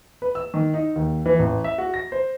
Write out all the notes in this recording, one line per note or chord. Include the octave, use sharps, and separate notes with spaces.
B4
E6
D#3
D#4
D#2
E3
A1
E5
F#4
A#6
C5